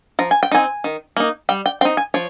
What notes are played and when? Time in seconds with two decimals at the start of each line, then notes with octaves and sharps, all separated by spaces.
0.19 F3 A#5
0.31 G#5
0.43 G5
0.52 C4 D#4 G#5
0.84 D#3
1.16 A#3 D#4
1.49 G3 G5
1.66 G5
1.81 C4 D#4 G5
1.97 G#5
2.14 F3 C#5